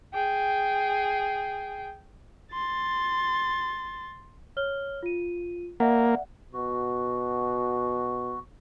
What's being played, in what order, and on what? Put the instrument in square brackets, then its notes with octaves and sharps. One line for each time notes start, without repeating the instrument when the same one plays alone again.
[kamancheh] G#4 G5
[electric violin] C6 A6
[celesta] C#5 F6 G7
F4 D#7
[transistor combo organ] A#3 [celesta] D5 E5 F#5
[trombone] B2 [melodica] F#4